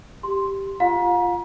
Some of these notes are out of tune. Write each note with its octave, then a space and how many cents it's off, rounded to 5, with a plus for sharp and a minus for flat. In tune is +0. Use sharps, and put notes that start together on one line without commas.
G4 +0 C6 +0
F4 -10 F5 +45 A#5 +35